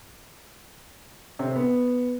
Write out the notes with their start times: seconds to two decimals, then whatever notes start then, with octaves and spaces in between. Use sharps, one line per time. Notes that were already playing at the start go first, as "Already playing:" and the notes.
1.39 C3
1.48 C4
1.56 B3